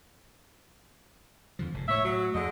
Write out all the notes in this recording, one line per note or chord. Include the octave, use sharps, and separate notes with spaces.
F2 D3 F3
F1 G#2
A2 A3 C#5 E5
F#3
F2 D3 G#3 D#5